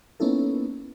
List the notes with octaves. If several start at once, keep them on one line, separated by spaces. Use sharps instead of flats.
A#3 B3 C#4 D#4 E4 A4